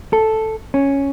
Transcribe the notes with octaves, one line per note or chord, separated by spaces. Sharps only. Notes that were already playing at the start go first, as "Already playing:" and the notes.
A4
C#4